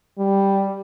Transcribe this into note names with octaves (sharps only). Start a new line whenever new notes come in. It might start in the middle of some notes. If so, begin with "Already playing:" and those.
G3